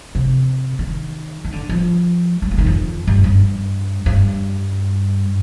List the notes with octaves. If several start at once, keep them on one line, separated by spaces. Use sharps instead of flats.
C3
D#3
D#3
D3
F3
G3
F3
D#3
F2
G2
G2
G2